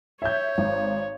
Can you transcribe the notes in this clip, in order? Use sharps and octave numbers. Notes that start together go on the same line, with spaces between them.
C#5 E5 G6
G#1